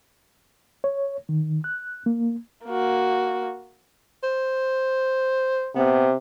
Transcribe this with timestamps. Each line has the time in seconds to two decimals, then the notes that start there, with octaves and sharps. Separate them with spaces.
0.84 C#5
1.29 D#3
1.64 F#6
2.06 A#3
2.66 A#3 F#4
4.23 C5
5.75 C3 B3